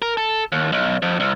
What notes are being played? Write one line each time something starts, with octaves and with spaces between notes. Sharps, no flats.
A#4
A4
D#2
B1
F2
C2